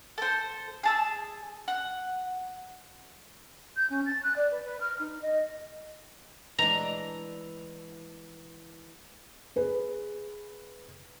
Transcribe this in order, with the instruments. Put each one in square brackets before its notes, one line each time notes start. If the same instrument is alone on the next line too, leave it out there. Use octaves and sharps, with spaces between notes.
[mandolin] A4 C5
G#4 A5 E6
F#5
[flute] G6
C#4
A6
F#6
D5
B4
B4
F6
D#4
D#5
[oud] E3 G#3 D4 [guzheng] A#5
[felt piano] G#4 B4